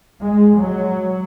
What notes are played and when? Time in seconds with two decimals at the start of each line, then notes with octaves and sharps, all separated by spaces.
0.21 G#3
0.57 F#3